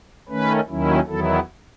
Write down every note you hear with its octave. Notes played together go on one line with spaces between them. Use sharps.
D#3 A3 C#4 B4
D#2 D#3 F#3 C#4 E4
E2 D#3 F#3 B3 E4 A4